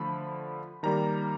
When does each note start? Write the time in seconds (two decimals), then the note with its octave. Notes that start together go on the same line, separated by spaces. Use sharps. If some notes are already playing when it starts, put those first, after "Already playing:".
Already playing: D3 F3 A3 B5
0.83 D#3 G3 A#3 A#5